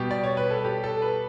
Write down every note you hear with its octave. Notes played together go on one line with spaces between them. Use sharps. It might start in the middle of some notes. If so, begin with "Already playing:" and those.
Already playing: B2 G3 G4
D5
C#5
B4
A4
G4
A4
B4